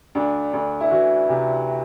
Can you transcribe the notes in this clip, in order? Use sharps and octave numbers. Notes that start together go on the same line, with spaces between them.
D2 D4
D2
E4
E3 F#4
C3